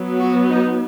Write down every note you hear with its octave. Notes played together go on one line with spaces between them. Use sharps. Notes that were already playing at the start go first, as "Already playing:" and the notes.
Already playing: F#3 B3
F#4
D#4